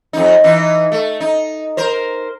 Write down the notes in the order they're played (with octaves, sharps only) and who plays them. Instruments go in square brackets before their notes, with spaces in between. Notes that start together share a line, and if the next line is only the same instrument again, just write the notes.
[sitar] F2 D#4
E3 D#4
A3
D#4
A#4 C5